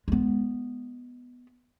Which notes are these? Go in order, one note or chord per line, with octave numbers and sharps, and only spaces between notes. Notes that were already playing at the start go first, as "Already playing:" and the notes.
G#3 B3